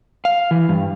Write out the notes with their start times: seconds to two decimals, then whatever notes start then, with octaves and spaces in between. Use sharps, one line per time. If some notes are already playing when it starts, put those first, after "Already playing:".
0.25 F5
0.51 E3
0.69 G2